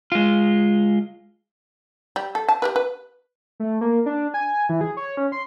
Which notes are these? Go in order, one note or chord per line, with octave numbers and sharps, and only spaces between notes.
G#3 F4
G3
A4
A5
G4 A#4 B4
B4
A3
A#3
D4
G#5
E3
G#4
C#5
C#4
C6